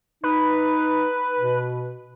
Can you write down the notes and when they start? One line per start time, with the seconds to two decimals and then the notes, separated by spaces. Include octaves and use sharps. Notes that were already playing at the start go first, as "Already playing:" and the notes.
0.24 D#4 B4
1.39 B2